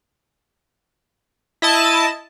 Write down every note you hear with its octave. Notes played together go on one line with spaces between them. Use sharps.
E4 D#5 A5